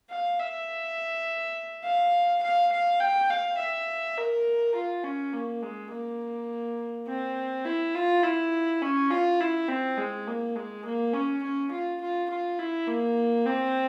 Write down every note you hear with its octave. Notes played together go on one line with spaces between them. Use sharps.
F5
E5
F5
F5
F5
G5
F5
E5
A#4
F4
C#4
A#3
G#3
A#3
C4
E4
F4
E4
C#4
F4
E4
C4
G#3
A#3
G#3
A#3
C#4
C#4
F4
F4
F4
E4
A#3
C4